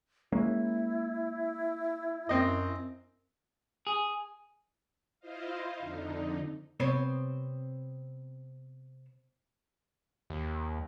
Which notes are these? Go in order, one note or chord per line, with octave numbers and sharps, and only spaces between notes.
G#3 A#3 C#4 E4
F#2 C4 D#5
G#4
E4 F4 C5 D#5 F5
F2 D3 D#4
C3 B3 C4 C#5
D#2